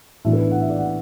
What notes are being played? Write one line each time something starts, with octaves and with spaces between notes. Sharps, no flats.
B1 A2 E3 D4 E5
B4
F#5
E5
D5
F#5